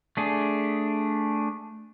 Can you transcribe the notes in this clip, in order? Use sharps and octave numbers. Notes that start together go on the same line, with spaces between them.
A3 D4 G#4